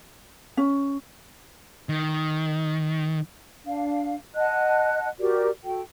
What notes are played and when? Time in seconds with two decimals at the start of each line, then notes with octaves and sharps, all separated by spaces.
0.57 C#4
1.89 D#3
3.65 D4 F5
4.36 D#5 F#5 A5 F#6
5.20 F#4 G4 A#4 D5
5.65 F#4 A4 G5